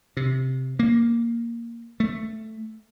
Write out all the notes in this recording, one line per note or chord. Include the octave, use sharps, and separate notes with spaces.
C3
A#3
A3